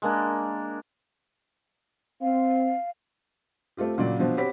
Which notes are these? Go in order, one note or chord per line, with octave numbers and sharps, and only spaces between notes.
G#3 A#3 D4
C4 F5
A3 C4 F4 G4
A#2 C#3 F#3 D5
B2 F3 F#3 D4
C4 F#4 G4 C#5 B5 B6